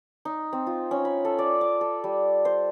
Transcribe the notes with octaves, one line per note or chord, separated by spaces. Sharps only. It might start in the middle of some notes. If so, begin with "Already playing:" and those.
D#4
C4
F4
C#4
B5
A4
D5
D6
A4
G3
C5